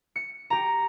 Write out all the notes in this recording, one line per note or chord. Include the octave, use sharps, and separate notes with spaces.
C#7
G4 A#5